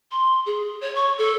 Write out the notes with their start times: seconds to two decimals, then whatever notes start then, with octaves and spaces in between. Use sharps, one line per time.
0.11 C6
0.46 G#4
0.81 C#5
0.95 C#6
1.18 A4